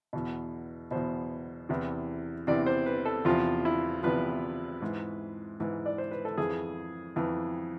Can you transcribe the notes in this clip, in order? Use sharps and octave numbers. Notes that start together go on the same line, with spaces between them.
E2 B2
E2 B2 C5
E2 C3 E3
E2 C3 E3 D5
C5
B4
A4
E2 C3 F3 F4
E4
E2 C3 F3 B4
G#2 E3
G#2 E3
D5
C5
B4
A4
F2 E3 G#4
F2 E3